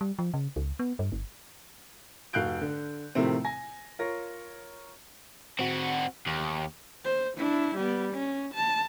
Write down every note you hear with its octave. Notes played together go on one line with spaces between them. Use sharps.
G3
F3
C#3
C#2
B3
G2
G1
F1 F#4 F5 F#6 G6 D7
D3
A2 C3 D#3 F3 A3 C4
G#5 A#6
F4 A#4 C#5 A#6
C4 F#4
D#2
C5
D4 E4
G3 B3
C#4
A5